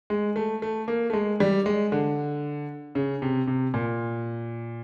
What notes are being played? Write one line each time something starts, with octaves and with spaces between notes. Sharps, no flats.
G#3
A3
A3
A#3
A3
G#3
G3
G#3
D3
C#3
C3
C3
A#2